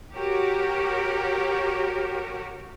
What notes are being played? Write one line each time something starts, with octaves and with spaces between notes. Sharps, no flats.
F#4 G4 A#4 C#5